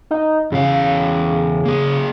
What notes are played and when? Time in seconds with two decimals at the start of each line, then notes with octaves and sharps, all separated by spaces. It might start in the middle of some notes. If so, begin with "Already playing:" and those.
0.11 D#4
0.52 E2 C#3 F5
1.65 A#3 G#4